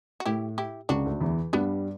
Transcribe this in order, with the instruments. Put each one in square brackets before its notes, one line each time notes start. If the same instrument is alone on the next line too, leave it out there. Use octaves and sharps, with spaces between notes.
[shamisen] F#4
[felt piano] A2 [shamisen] E4 G4
[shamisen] E4 G4
[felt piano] C#2 C#3 [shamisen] D4 F#4
[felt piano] D2 D3
E2 E3
[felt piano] G2 G3 [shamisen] B3 D4